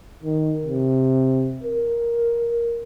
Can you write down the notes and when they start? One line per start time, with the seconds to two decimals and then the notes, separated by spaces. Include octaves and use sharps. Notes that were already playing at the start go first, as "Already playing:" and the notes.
0.23 D#3
0.64 C3
1.63 A#4